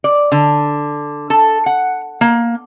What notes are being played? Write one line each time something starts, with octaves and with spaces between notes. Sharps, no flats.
D5
D3
A4
F#5
A#3